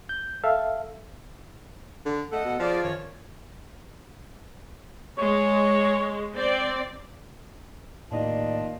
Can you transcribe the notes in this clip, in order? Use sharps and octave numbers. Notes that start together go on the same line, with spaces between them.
G6
A4 E5 F5
D3
A3 A4 D#5 F#5
B2
F3 F4 G#4 D5
F#2 D#3 C#5
G#3 C#5
C4 D5
D#2 A2 D4 F4 D5 D#5